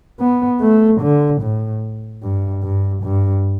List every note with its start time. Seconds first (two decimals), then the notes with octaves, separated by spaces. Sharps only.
0.20 B3
0.61 A3
1.01 D3
1.42 A2
2.23 G2
2.63 G2
3.03 G2